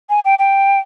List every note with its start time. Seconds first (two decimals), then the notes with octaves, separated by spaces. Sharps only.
0.10 G#5
0.25 G5
0.39 G5